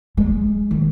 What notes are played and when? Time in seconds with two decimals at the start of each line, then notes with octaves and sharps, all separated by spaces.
0.17 G#3
0.71 D#3